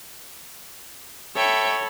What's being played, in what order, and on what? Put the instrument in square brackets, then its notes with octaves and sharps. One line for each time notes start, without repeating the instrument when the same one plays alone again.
[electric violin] A4 B5 [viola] C#5 [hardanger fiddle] E5 G5